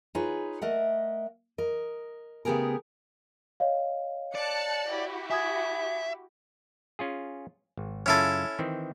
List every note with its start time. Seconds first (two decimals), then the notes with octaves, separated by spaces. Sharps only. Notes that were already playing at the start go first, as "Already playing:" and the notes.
0.15 D#4 F4 G#4 B4 C#5
0.62 A3 A#4 D#5 E5 F#5
1.58 A#4 D#5
2.45 C#3 A3 B3 G4 G#4 A#4
3.60 C#5 D#5 F5
4.35 D5 A5 F#6 C#7
4.89 E4 F#4 G4
5.31 E5 G#5 D#6 G#6
6.99 C#4 F4 G#4
7.77 G#1
8.06 F#2 C#3 C#4 E4 F4 A4
8.59 D#3 E3 C4